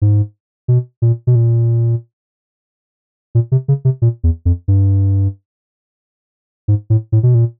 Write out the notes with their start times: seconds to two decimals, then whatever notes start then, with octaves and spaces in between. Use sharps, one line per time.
0.02 G#2
0.68 B2
1.02 A#2
1.27 B2
1.35 A#2
3.35 A#2
3.52 C3
3.68 C#3
3.85 C3
4.02 A#2
4.24 E2
4.45 F2
4.68 G2
6.68 G#2
6.90 A2
7.12 A2
7.23 B2
7.35 A#2